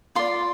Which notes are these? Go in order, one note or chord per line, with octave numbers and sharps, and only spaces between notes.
F4 D5 C6